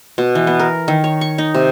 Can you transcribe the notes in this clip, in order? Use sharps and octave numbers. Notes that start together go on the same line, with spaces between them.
B2
E3
B3
A#4
D#3
C#5
C#6
D#4
C3